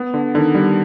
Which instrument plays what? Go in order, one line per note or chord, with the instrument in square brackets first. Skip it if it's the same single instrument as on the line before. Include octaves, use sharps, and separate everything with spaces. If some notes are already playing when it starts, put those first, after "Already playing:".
Already playing: [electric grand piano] B3
D3
[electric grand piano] D3 [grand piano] D#3
[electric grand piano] G3